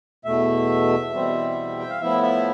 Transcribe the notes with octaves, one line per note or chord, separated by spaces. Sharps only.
E2 B2 A3 E5
E2 B2 G3 C4
G5
F5
A2 F3 B3 E4 E5
E5